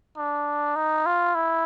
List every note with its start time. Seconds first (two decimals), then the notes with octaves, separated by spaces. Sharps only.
0.17 D4
0.76 D#4
1.06 F4
1.35 E4